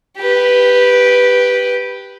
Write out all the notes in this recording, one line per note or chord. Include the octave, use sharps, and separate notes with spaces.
G4 B4